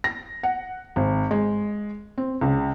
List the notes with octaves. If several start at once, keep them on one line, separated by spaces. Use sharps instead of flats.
A#6
F#5
G#1
G#3
C4
C#2